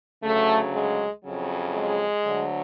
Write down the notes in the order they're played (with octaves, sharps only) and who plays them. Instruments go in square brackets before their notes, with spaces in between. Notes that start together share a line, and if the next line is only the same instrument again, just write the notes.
[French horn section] D2 C#3 F#3 A3
G#3
F2 C#3 F#3
G#3
D2 D3 F#3